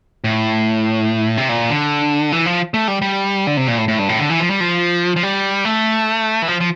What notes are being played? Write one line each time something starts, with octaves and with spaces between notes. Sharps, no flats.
A2
C3
A#2
D3
E3
F3
A3
G3
G3
D3
C3
A#2
A2
A2
G2
A2
D3
E3
F3
G3
F3
F3
G3
A3
E3
F3
F3